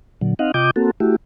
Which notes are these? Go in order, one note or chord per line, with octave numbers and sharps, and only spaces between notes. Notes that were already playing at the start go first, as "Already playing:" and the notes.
A#2 D3 F#3
C4 D#4 D#5 F5 F#5
C3 F4 D#5 G5 D6 G6
A#3 C4 F#4 A4
A3 E4 F#4 G4